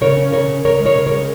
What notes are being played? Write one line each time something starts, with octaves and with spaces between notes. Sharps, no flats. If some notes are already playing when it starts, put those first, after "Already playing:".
C#3 A#4 C#5
C#4
C#3 A#4 C#5
C#3
C#3 A#4 C#5
G#3
A#4 C#5
C#3
A#4 C#5
G#3